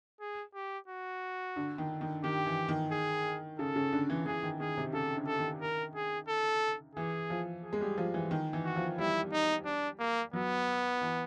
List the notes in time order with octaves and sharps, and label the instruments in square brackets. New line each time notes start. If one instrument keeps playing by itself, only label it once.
[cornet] G#4
G4
F#4
[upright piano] D3
D#3
D#3
[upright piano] D#3 [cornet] G4
[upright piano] E3
D#3
[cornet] G#4
[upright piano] C#3 [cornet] A4
[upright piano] C#3
D3
E3
[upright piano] E3 [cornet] G#4
[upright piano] D#3
[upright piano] D#3 [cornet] G#4
[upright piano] C3
[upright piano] C#3 [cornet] A4
[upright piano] D3
[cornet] A4
[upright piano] D#3
[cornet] A#4
G#4
A4
[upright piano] E3 [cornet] G#4
[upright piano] F3
[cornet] G#4
[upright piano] G#3
G3
F3
E3
D#3
E3
[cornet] F#4
[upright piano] F3
[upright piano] G3 [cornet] E4
[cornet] D#4
D4
A#3
[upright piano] F#3 [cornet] B3
[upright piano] E3